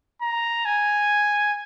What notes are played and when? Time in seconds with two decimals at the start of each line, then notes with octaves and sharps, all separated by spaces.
0.22 A#5
0.65 G#5